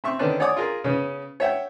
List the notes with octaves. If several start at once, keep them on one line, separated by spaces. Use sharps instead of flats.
C4 E5 C#6
D3 D#3 B3 C#4 D4
C#5 D5 F#5 G#5 D6 D#6
F4 G#4 A#4
C#3 B3 C#4
C#5 E5 F#5 G5